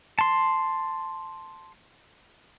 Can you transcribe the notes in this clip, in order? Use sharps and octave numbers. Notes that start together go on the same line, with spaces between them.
A5 C6